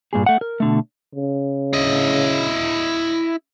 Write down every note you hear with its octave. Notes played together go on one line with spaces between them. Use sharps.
G2 A#2 G#4
A3 F#5
A#4
B2 D3 A3
C#3
E4 D#5